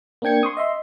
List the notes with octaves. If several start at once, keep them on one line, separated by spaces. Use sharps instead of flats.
A#3 C4 D4 G5 G#6 C#7
C6 C#6 D#6
D#5 E5 C6